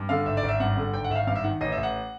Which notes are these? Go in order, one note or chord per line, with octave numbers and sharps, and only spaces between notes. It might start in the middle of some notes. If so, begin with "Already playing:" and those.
Already playing: G2
D3 F5
G#1 E5
D5
G#1
E5
G2 F#5
D3
G#1 G5
F#5
G#1 E5
F5
G2 F5
E5
D#3 F#5
A1 D#5
E5
A1
F#5